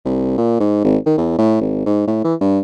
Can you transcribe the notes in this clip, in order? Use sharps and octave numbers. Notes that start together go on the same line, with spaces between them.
C2
A#2
G#2
G#1
D#3
E2
A2
G#1
G#2
A2
E3
G2